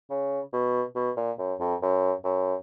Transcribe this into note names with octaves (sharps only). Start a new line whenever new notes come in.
C#3
B2
B2
A#2
F#2
F2
F#2
F#2